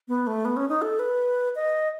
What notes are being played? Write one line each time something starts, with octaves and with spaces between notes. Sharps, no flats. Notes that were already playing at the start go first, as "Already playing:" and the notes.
B3
A3
B3
C#4
D#4
A4
B4
D#5